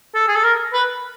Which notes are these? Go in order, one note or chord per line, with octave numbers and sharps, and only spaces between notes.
A4
G#4
A4
A#4
B4